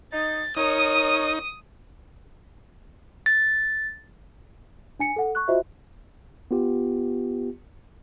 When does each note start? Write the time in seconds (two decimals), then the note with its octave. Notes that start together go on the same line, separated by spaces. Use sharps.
0.13 D#4 A6
0.57 D#4 A#4 C#5 D#6
3.26 A6
4.99 D4 G#5 C#7
5.16 A4 F#5
5.35 C#6 F#6
5.48 F4 F#4 C5 D#5 E5
6.51 B3 F4 G4